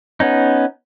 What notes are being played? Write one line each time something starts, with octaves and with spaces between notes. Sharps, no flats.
B3 C#4 D#4